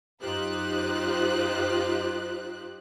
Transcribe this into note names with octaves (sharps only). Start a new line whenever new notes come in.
F#2 D#4 F4 G4 C5 F#6